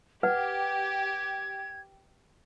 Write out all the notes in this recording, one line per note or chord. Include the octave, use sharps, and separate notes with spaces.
G4 B4 F#5 G#6